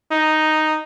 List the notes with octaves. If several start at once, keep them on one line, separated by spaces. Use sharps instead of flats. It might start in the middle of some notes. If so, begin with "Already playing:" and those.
D#4